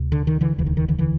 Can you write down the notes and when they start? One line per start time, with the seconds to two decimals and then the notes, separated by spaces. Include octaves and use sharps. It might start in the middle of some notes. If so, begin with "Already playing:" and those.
Already playing: D2 C3
0.12 D3
0.27 D#3
0.41 D3 E3
0.56 E1 D2 C#3 E3
0.66 D#3
0.77 D#3
0.88 D3 E3
0.98 D3 E3